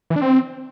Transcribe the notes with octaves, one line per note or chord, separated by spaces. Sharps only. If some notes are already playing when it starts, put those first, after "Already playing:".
E3
D4
C4